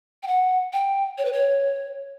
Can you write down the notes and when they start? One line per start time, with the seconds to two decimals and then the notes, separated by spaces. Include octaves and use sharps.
0.23 G5
0.27 F#5
0.73 G5
1.18 C#5
1.25 B4
1.33 C#5